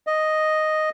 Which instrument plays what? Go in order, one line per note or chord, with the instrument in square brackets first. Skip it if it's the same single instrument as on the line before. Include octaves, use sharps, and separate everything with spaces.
[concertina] D#5